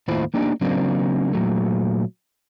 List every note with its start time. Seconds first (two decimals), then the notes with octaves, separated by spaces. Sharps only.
0.08 D#2 A2 E4 F4 C5 B5
0.34 A#3 D4 D#4 G4
0.61 C#3 F#3 A#3 C4 D4
1.33 A#2 F#3 A3